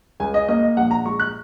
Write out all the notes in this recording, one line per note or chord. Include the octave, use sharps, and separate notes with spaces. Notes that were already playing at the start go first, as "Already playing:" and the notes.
C#2 G#5
D#5
A#3 D#5
D#5
A#1 F#5
A#5
G#3 C#6
F#6